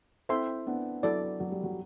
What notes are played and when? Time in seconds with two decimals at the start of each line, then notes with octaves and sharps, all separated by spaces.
0.29 C4 E4 A4 C5 E5 G5 C6
0.66 B3 D4
1.03 F#3 E4 A4 D5
1.40 F#3
1.52 G3
1.63 F#3